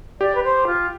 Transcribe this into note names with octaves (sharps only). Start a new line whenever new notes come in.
G4 D5
B4
C5
F4